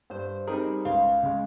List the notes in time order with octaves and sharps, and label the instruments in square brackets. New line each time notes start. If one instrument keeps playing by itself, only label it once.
[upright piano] G2 [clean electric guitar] C5
[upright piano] G3 C4 D#4 A#4 [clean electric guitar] G#4
[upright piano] C#2 [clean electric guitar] F5
[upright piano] C#3 G#3